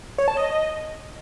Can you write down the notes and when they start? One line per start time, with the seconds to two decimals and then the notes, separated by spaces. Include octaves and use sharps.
0.18 C#5
0.28 A5
0.37 D#5